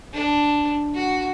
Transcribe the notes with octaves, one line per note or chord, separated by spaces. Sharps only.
D4
F#4